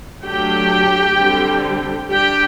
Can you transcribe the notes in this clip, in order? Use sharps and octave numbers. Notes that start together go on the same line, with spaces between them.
F#3 A3 D4 G4 G5
D3 G3 C4
G3 D4 G4 G5